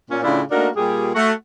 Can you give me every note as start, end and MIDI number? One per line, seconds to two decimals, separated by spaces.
0.10 0.22 46
0.10 0.22 61
0.24 0.42 45
0.24 0.42 49
0.24 0.42 62
0.24 0.42 64
0.24 0.42 65
0.51 0.69 57
0.51 0.69 58
0.51 0.69 62
0.51 0.69 63
0.51 0.69 66
0.51 0.69 70
0.76 1.09 46
0.76 1.09 55
0.76 1.09 67
0.76 1.09 68
1.15 1.32 57
1.15 1.32 66
1.15 1.32 78